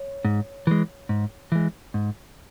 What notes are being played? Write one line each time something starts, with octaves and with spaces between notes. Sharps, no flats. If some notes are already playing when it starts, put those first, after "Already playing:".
Already playing: C#5
G#2
E3 G#3
G#2
E3 G#3
G#2